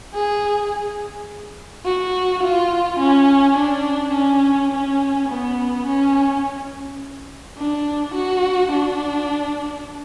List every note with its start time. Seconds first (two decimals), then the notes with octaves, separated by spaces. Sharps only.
0.14 G#4
1.85 F#4
2.43 F4
3.00 C#4
3.57 D4
4.14 C#4
4.71 C#4
5.29 B3
5.86 C#4
7.57 D4
8.15 F#4
8.72 D4